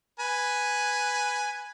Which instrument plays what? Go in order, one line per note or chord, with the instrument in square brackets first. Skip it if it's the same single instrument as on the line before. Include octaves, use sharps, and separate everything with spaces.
[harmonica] B4 G#5